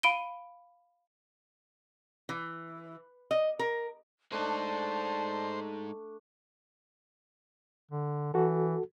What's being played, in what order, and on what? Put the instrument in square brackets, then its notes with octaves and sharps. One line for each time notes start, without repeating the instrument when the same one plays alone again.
[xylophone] F5 B5 D7 D#7 G7
[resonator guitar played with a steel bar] E3
D#5
A#4
[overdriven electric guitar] G#3 D#4 [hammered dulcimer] A3 D4 [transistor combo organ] C5 [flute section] D5 A5
[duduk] D3
[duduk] E3 [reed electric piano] F#4 A4